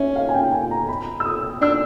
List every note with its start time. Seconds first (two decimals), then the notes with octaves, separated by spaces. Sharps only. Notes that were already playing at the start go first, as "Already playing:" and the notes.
Already playing: C#4 E5
0.16 F5
0.29 G#5
0.34 G5
0.52 G#5
0.71 A#5
0.88 B5
1.20 E6
1.26 D#6
1.62 D4 E6